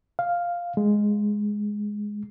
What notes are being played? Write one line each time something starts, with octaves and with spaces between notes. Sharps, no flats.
F5
G#3